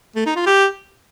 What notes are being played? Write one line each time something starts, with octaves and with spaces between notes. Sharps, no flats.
A3
D#4
F4
G4